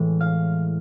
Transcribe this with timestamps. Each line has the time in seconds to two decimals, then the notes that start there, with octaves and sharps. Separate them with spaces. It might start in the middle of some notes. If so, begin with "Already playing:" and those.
Already playing: A2 E3 G#3
0.21 F5